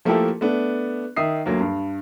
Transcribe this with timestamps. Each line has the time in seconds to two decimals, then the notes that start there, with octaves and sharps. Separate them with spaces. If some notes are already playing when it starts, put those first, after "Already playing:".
0.05 F3 A3 A#3 E4 G4 A4
0.41 A3 B3 D4
1.16 D#3 E5 D#6 C7
1.46 D2 F#3 A#3
1.61 G2